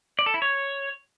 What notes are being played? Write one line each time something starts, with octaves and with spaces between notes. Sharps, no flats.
D5
A4
E4
C#5